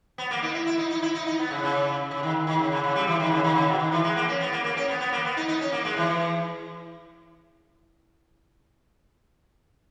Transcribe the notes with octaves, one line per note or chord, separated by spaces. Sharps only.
B3
A#3
D#4
E4
E4
D#4
D#4
E4
D#4
D#4
B3
C#3
C#3
C#3
D#3
D#3
C#3
C#3
C#3
G3
E3
D#3
C#3
D#3
C#3
B2
D#3
E3
G#3
A#3
C#4
B3
A#3
A#3
C#4
B3
B3
A#3
B3
D#4
D#4
C#4
A#3
G#3
E3